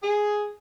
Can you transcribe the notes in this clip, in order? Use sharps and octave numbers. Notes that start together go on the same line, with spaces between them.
G#4